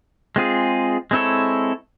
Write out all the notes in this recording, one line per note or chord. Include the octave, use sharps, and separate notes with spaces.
G#3 C4 F4 G#4
G#3 C4 E4 A4 C#5